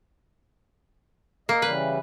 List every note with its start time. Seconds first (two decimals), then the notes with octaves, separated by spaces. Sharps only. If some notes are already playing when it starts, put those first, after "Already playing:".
1.49 A#3 D#5
1.62 C#3 E3 G3 B4